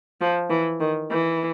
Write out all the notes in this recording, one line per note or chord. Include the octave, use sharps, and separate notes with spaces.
F3
E3
D#3
E3